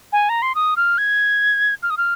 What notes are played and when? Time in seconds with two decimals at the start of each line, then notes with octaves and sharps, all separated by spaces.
0.13 G#5
0.29 A#5
0.42 C6
0.55 D#6
0.77 F6
0.98 G#6
1.83 F6
1.90 D#6
1.97 F6